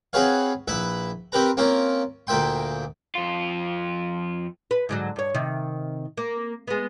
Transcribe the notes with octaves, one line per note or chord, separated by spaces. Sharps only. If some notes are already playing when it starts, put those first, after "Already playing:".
C4 F#4 G#4 B4 C#5 F5
A#1 E4 B4 E5
C4 G4 A#4 B4 A#5
A#3 C4 C#4 F4 A#4
D2 A#2 A#3 E5 G5 C6
F2 F4
B4
G#2 D3 F#3
G2 C#5
C3 D#3
A#3
G#3 B3